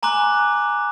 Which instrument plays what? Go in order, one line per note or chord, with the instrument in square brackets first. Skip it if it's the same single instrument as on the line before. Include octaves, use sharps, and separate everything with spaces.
[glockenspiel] G#5 A#5 C6 D6 F#6